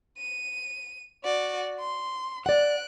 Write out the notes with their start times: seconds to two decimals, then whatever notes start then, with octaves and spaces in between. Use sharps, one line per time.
0.17 D#7
1.24 F#4 D5
1.79 C6
2.46 D5 F#5 F#6 D7